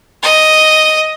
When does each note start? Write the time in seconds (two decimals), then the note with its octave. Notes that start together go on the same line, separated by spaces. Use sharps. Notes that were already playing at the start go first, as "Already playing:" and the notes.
0.23 D#5